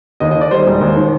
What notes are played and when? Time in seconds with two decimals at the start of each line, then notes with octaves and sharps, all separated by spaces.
0.20 D#2 D#5
0.31 D#3 D#5
0.41 D5
0.51 G3 C5
0.67 E1
0.81 D#2
0.96 D#3